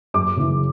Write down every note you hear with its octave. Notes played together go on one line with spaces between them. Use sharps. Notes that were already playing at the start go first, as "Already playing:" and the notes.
F#2 D6
C#3 E3